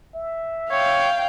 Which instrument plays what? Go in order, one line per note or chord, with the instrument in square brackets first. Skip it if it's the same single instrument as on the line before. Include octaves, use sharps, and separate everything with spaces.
[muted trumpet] E5
[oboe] C#5 [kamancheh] F5 G5